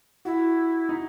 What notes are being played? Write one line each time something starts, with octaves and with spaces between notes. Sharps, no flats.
E4 F#4
D#4